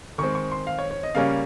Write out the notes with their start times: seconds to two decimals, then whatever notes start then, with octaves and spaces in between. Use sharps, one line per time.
0.18 D#3 G#3 C4 C#6
0.35 C#6
0.51 C6
0.67 F5
0.79 C#5
0.91 C#5
1.03 D#5
1.15 C#3 G3 A#3 C#4 F5